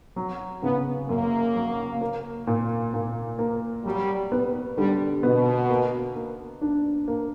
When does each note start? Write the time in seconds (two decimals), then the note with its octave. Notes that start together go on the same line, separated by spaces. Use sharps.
0.16 F#3
0.63 C#3 B3
1.09 F#2 A#3
1.56 F#3
2.01 A#3
2.47 A#2
2.94 A#2
3.39 A#3
3.85 F#3 G3
4.32 B3
4.77 D3 G3
5.23 B2 B3
5.69 A#3
6.16 A#3
6.61 D4
7.08 A#3